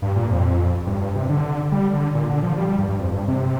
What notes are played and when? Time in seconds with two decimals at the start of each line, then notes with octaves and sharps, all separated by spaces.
0.02 G2
0.16 A#2
0.30 F2
0.87 G2
1.01 G2
1.15 C3
1.29 D3
1.72 G3
1.93 D3
2.14 A#2
2.29 D3
2.43 F3
2.57 G3
2.68 G3
2.79 G2
2.89 G2
2.99 F2
3.14 G2
3.28 C3